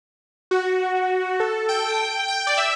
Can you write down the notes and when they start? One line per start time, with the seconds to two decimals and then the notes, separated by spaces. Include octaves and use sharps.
0.51 F#4
1.40 A4
1.69 G5
2.28 G5
2.47 D5
2.57 E5